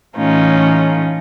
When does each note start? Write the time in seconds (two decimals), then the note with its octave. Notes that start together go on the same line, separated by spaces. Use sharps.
0.16 A2 E3 A3 C#4 D#4 F4